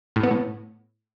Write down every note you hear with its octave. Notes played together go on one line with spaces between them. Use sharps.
A2
B3
A2